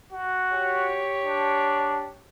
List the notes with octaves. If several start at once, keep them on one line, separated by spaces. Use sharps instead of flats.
F#4
G4 C#5
D4